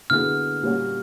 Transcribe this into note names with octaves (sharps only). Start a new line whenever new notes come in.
D3 F#3 B3 E4 G#4 F6
A#2 G3 A#3 C#4 F#4